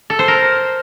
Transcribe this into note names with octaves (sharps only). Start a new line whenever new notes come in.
A4
C5
A#4